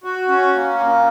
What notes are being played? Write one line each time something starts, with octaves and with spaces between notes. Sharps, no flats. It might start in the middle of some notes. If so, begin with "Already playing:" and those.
F#4
C#4
A#3
A#2